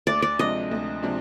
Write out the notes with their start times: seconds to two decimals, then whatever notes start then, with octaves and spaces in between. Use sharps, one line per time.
0.07 D2 D5
0.22 D5
0.39 C3 F3 G#3 D4 D#5
0.71 D2
1.03 C3 F3 G#3 D4